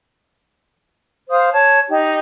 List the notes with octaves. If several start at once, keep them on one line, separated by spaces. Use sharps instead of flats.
C5 F5 D#6
C#5 A5
D#4 G4